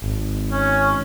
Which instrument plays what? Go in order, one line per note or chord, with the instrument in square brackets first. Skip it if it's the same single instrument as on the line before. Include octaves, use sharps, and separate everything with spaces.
[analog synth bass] G#1
[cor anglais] C#4